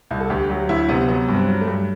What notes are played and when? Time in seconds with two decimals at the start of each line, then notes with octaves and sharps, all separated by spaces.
0.11 C2
0.20 A4
0.30 D2 G4
0.50 F#3 G4
0.69 D2 E4
0.89 C3 B3
1.08 F#3 B3
1.28 G2
1.35 C4
1.48 F#3
1.61 A3
1.67 G2